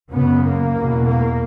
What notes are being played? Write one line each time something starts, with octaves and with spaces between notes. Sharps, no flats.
F#2 C#3 B3
A#3
E2 B2
A#3